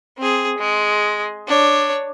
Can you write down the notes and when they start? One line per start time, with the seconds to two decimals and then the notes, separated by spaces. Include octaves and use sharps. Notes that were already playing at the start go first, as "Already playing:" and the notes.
0.18 C4 G#4
0.58 G#3
1.47 D4 C#5